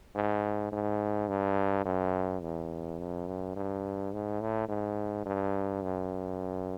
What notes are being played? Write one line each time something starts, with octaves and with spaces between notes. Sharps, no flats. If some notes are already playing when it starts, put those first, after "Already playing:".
G#2
G#2
G2
F#2
E2
F2
F#2
G2
G#2
A2
G#2
G2
F#2